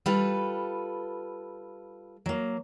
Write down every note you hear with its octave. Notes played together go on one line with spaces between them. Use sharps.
G3 F4 A4 B4
F#3 A#3